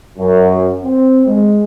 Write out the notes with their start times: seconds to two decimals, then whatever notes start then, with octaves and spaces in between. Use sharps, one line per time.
0.17 F#2
0.84 C4
1.27 G#3